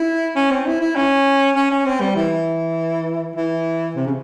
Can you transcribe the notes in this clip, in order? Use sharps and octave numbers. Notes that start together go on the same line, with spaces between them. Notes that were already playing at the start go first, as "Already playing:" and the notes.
Already playing: E4
C#4
C4
E4
E4
C#4
C#4
C#4
C4
G3
E3
E3
C3
C#3